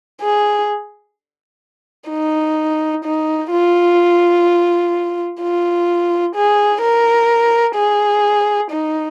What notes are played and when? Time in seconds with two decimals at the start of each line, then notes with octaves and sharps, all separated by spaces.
0.21 G#4
2.10 D#4
3.05 D#4
3.51 F4
5.41 F4
6.35 G#4
6.81 A#4
7.76 G#4
8.71 D#4